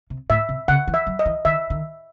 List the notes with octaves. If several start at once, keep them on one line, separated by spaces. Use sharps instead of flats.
C3
A2 E5
C3
C#3 F#5
E3
E5
F#3
D#5
E3
D#3 E5
D#3